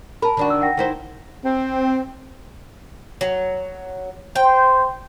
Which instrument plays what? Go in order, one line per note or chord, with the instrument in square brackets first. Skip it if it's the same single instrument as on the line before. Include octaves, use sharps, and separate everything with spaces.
[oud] A#4 [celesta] A5 B5
[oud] D#3 D4 F#4
[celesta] E6
F#5 G5 A#6
[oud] D#3 E4 C5
[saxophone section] C4
[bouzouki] F#3
[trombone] C5 [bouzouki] G5